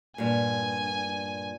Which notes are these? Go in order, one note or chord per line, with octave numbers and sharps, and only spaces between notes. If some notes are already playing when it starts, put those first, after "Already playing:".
G2 A#2 G#5